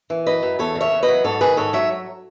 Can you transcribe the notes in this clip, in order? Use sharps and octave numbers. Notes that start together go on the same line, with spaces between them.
E3
F#2 B4 D#5
F#2
E2 A4 C#5
C#3
C#5 E5
E2
B4 D#5
F#3
G#2 A4 C#5
D#3 G#4 B4
G#2 A4 C#5
F#3 C#5 E5